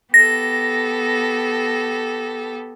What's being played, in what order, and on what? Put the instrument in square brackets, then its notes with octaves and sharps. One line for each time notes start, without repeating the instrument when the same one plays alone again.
[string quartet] B3 G4 A4 [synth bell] A#6